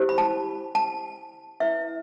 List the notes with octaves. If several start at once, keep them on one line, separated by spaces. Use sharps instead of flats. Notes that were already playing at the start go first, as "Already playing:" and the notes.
Already playing: E4 G4 C5
B5
A5
A5
E4 B4 E5